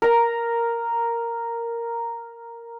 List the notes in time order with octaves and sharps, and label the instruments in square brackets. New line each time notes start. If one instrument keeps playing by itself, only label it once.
[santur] A#4 A#5